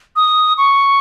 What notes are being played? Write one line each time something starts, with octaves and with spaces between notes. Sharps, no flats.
D#6
C#6